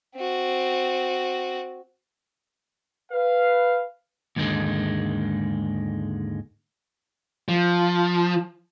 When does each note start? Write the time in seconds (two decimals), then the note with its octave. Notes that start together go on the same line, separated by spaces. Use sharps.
0.16 C4 F#4
3.12 B4 F5
4.36 D#2 G#2 D3 D#3 G#3
7.48 F3